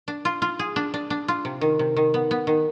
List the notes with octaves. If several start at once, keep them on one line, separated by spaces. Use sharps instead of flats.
D4
F4
F4
G#4
D4
D4
D4
F4
C3
D#3
C3
D#3
B3
B3
D#3